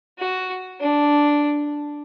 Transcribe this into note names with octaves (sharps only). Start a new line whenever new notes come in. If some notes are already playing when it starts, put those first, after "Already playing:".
F#4
D4